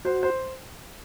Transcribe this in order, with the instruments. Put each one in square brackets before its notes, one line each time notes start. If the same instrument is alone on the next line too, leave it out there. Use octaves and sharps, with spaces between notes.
[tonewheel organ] F#4 [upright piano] C5
[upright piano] C5